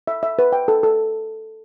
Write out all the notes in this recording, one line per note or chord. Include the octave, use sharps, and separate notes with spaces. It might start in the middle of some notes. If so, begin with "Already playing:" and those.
E5
E5
B4
G5
A4
A4